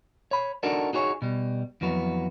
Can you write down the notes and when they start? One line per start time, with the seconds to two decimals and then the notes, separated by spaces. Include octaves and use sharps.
0.31 C#5 B5
0.63 D4 D#4 F#4 A4 A#4 D5
0.93 D#4 F#4 G#4 C#5
1.22 B2 G3
1.81 F2 E3 F#3 B3